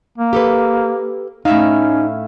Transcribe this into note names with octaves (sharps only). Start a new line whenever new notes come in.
A#3
G4 A4 B4
A2 C#4 D#4 E5 F5